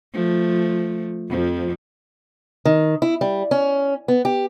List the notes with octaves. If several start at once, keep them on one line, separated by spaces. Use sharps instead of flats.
F3 A3
F2 F3
D#3
E4
G3
C#4
B3
G4